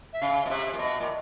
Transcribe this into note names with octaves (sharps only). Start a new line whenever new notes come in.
E5
C#3 F5
B2
C3 E5
A#2
B2 D#5
A#2